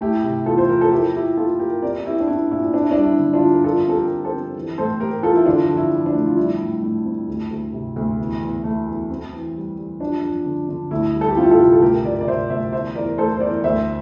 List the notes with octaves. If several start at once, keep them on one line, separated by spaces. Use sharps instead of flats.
A3 E4 G4
C3
E2 F4 A4
C5
F3 A#4
A4
F3 E4 G4
F3 E4 G4
A#3 F4 A4
A#3 G4 A#4
C4 A#4 D5
C4 E4 G4
D4
C4 E4
A#2 E4
C4 D4
E4
D4
G3
E4
D3
D4 F4
G3
A#4
F3 F4 A4
C4 A4
G4 A#4
F3
A4 C5
C4
E3
A2 A4 C5
A3 G4 A#4
E3 F4 A4
E4
D3 D4 F4
F2
E4
F2
D4
A3
F4
G3 E4
A2
A2
C4
D2
D2
C3
D2
E2
E2
A3
E2
C4
E3
G3
G3
F3 D4
F2
D3
D3
D2 E4
G3
A4
G4
C4 F4
E4 G4
F4 A4
C3
A4
D2 G4 A#4
C3 A#4 D5
D5
C3 C5 E5
D2 C5 E5
E2 C5 E5
E2 A#4 D5
A3 A4 C5
C5
E2 A#4 D5
D2 C5 E5